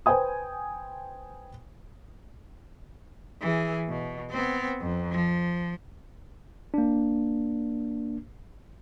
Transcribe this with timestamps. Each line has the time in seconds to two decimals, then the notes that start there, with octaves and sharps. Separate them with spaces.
0.06 B4 C5 G5 G#5 D#6
3.41 E3 G#4
3.89 B2
4.30 B3 C4
4.81 F2
5.11 F3
6.74 A#3 D4